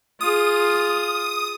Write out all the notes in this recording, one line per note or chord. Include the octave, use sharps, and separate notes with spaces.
F4 G#4 D#6